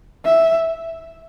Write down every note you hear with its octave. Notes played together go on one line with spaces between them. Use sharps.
E5